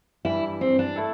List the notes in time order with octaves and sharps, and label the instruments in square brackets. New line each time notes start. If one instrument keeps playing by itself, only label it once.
[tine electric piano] G2 E3 G3 [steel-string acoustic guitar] E4
[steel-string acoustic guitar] C4
D4
[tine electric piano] A3 E4 A4